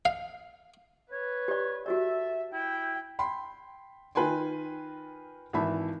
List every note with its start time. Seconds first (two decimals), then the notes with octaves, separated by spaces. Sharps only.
0.05 F5
1.12 B4 C#5
1.48 G4 D5
1.86 F#4 G4 A4 D5 E5
2.53 E4 G5
3.19 G5 B5 C6
4.15 D#3 F4 B4 G5 G#5 C6
5.53 G#1 E3 E5 A5 B5